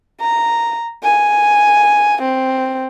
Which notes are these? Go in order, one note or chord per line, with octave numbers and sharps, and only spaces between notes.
A#5
G#5
C4